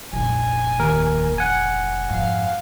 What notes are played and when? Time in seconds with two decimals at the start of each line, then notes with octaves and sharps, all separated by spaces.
0.13 F1 A#1 G#5
0.79 D#2 A#4
1.38 F#5 G#5
2.10 F2 G#2 F5